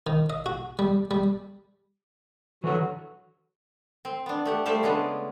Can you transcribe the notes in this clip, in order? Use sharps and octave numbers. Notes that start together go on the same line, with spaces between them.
D#3
D#5
F#4
G3
G3
D3 E3 F#3 F#4 A4 F#5
C4
B3 D4
A3 G4 F#5
G3 A3 C5 E5 F5
C#3 G#3 A3 B3 D4